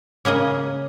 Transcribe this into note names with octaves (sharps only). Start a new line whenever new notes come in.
C#3 A#3 G#4 D#5